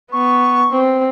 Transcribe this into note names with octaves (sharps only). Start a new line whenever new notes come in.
B3 C#6
C4